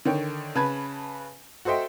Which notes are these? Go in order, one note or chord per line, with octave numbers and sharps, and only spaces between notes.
D3 D#3 C#5 G5
C#3 B4 A5 B5 G#6
F#4 A4 C5 D#5 E5 G5